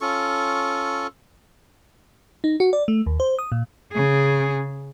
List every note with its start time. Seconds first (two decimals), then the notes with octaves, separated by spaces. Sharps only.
0.01 C#4 F4 A4 C#6
2.44 D#4
2.60 F#4
2.73 D5
2.88 A3
3.06 D#2
3.20 C5
3.39 D#6
3.52 A#2
3.92 C#3 G#4